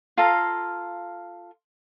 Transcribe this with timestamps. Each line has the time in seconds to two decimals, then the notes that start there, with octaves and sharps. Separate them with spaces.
0.17 F4 A4 F5 A#5